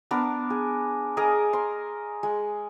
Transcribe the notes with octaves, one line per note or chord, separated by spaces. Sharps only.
B3 D4 A#4
G#4
G#4 A#4 D#5 A#5
C6
G#3